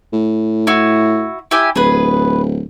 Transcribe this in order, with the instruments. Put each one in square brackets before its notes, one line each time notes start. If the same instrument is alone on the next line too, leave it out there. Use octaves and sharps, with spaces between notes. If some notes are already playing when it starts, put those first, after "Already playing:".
[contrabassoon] A2
[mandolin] E4 F#4
E4 G4 G#5
[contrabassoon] D1 [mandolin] G#4 B4